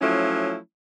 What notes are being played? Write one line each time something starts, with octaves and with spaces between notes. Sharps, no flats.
F3 F#3 A3 C#4 E4